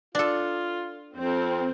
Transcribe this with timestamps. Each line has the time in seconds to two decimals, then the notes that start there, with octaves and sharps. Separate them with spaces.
0.15 D4 F4 A4
1.17 F2 C4